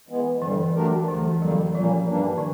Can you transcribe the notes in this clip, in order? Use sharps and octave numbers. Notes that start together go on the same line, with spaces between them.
E3 G#3 B3
G2 D3 E3 G3
F#3 A3 D4 G4 A#4
D2 D3 E3 F#3 A3
F2 D3 F#3 G3 A#3
A#2 F3 G3 A#3 C#4
G2 E3 G3 A#3 D4
D#3